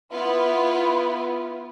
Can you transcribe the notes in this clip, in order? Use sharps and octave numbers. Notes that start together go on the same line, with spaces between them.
B3 E4 F4 B4